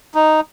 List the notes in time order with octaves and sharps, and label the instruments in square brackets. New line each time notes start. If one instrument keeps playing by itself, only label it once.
[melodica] D#4